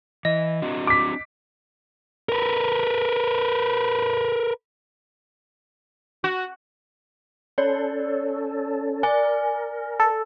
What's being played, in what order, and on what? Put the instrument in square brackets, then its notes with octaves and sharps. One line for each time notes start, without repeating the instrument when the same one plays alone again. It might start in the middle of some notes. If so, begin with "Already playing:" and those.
[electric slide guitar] E3 [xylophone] D#5
[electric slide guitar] C4 D4 F#4
[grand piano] D6 B6
[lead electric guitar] A#4 B4
[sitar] F#4
[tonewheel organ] C#4 A4 [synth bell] C#5 D5
[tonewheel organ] A#4 [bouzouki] D5 [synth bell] G#5
[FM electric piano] A4